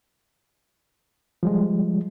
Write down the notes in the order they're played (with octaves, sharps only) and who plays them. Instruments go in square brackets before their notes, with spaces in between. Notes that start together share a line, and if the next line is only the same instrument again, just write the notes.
[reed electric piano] F3 G3 G#3